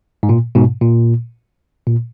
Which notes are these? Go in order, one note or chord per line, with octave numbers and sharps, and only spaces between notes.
G#2
A#2
G#2 B2
A#2
A#2